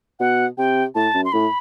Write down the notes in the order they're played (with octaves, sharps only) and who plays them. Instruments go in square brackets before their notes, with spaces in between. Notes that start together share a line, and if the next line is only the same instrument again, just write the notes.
[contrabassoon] B2 [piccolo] F#5
[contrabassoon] C3 [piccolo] G5
[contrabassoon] A2 [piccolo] A5
[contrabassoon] F#2
[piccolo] C6
[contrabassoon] A2 [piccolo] B5